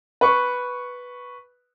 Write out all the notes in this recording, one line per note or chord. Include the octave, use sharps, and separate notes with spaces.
B4 C#6